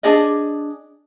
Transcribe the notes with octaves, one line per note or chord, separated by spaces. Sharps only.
D4 G#4 D5 D#5